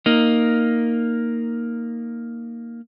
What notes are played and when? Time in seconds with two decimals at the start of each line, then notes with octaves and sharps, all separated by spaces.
0.06 A#3 D#4